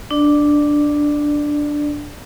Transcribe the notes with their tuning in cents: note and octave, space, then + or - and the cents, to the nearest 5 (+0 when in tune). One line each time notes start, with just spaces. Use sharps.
D4 +0 D5 +20